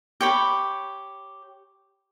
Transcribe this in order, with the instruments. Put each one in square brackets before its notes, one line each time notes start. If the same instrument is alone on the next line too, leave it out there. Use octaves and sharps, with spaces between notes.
[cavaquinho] G4 C#5 B5